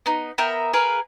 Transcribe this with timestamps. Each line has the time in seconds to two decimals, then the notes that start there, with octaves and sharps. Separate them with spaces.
0.06 B3 D#4
0.38 B3 A#4 E5 G5
0.73 G#4 A#4 B4 F5